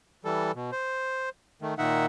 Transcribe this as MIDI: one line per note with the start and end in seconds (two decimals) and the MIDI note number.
0.25 0.52 52
0.25 0.52 55
0.25 0.52 69
0.55 0.71 47
0.72 1.29 72
1.62 1.74 51
1.62 1.74 57
1.78 2.06 46
1.78 2.06 51
1.78 2.06 63
1.78 2.06 76
1.78 2.06 78